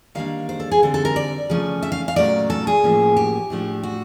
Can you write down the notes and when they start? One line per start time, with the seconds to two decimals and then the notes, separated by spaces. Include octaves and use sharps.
0.15 D#3 G3 A#3 D4 F5
0.49 C5
0.60 A4
0.72 G#4
0.83 D3 G3 C4 A4
0.94 A4
1.05 A#4
1.16 D5
1.49 C#3 F3 A3 C#4
1.83 E5
1.92 F5
2.08 F5
2.16 A#2 F#3 A3 C#4 D5
2.50 A4
2.67 G#4
2.84 A2 F3 A#3 C#4
3.17 G4
3.50 A2 F3 A3 D4
3.83 F#4